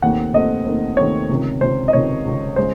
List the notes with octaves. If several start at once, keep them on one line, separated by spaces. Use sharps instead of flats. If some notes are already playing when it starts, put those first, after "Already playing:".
D#2 D#3 A3 C4 F#5
D#2 D#3 A3 C4 D#5
D#2 D#3 A3 C4
D#2 D#3 A3 C4 C#5
C#2 C3 D#3
C#2 C3 D#3 C5
D#5
C#2 C3 D#3 C#5
C#2 C3 D#3
C#3 G#3 C5